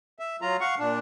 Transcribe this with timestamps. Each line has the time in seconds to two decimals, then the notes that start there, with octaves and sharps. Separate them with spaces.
0.19 E5
0.42 F#3 F4 A#5
0.61 F5 F#5 C#6
0.79 A#2 D4